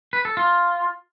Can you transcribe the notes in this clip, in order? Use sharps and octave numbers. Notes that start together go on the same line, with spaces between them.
B4
A4
F4